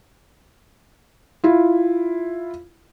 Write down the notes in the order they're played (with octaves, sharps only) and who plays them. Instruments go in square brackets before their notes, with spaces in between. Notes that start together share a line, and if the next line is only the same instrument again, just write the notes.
[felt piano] E4 F4